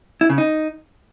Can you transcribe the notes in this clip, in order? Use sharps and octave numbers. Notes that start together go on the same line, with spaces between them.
E4
C#3
D#4